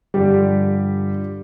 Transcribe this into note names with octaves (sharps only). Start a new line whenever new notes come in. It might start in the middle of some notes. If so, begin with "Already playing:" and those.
G2 D3 F3 G3 G4